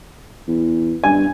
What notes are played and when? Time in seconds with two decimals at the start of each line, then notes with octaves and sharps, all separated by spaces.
0.48 E2
1.04 G2 G#5